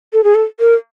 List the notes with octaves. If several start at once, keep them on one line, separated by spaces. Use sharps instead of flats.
A4
G#4
A4
A#4